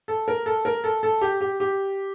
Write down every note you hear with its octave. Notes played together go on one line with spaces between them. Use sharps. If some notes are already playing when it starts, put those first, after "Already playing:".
A4
A#4
A4
A#4
A4
A4
G4
G4
G4